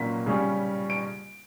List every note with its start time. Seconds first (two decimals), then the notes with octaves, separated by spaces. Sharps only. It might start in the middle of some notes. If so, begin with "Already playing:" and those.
Already playing: A#2 F#3 A#3 C#4 B6
0.26 C#3 G3 C#4
0.90 D7